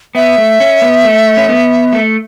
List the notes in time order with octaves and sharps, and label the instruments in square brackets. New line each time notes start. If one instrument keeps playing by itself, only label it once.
[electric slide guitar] B3 [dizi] E5
[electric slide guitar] A3
C#4
B3
A3
C#4
B3
A3